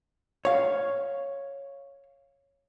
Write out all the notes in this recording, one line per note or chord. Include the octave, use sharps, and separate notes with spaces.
C#5 F5